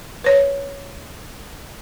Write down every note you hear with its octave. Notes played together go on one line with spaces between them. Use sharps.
B4 C#5